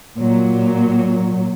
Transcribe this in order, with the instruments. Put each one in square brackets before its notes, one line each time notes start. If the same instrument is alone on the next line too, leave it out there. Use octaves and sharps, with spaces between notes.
[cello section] A#2 F#3